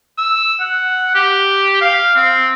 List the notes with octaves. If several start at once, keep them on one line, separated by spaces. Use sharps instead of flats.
E6
F#5
G4
F5
C4